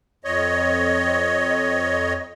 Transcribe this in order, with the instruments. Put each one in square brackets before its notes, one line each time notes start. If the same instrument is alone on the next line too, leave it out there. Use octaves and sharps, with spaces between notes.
[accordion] F2 C#5 D#5